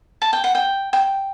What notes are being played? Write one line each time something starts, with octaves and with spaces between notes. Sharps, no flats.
A5
G5
F#5
G5
G5